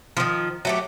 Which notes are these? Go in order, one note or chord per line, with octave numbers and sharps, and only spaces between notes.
D#3 F3
F#3 A3 G4